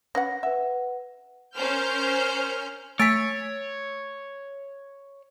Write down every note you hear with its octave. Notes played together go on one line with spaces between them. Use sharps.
C#4 B4 F#5 A#6
B4 E5 F#5
C#4 A#4 C5 F6 G6
A3 C#5 G#5 E6 A6 B6 D7